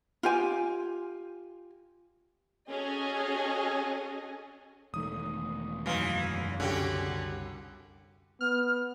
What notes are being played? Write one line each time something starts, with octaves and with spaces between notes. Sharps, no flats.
F4 G4 G#5
C#4 F#4 G#4 A4 D#5 G#5
E1 D#3 A3 D#6
F#2 C#3 E3 F#3 D#4 F5 C6
C2 D3 C#4 F#4 G4
B3 F6